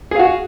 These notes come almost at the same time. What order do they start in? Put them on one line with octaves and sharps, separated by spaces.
G#4 F5 F#4